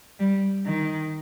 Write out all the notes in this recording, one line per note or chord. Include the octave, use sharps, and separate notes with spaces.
G3
D#3